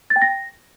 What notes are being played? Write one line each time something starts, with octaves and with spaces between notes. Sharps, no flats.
A6
G5
A#6